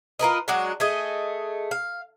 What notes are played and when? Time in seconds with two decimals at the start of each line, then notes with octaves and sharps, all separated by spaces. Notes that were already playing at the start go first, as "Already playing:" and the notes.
0.19 F4 A#4 B4 D#5
0.48 F#3 G#3 D4 F#4
0.80 A3 G#4 D#5
1.71 F5